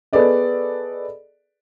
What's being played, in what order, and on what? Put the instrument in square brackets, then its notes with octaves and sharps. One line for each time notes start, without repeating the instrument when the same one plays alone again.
[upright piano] B3 G#4 A4 B4 D5 D#5